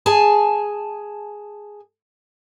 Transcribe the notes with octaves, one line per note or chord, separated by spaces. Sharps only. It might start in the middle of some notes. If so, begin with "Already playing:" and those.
G#4 G#5 A5